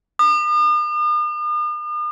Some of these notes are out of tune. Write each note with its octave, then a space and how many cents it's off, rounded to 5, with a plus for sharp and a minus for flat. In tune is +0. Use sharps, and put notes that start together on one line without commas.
D#6 -45